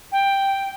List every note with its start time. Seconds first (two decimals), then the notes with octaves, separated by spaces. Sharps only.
0.11 G5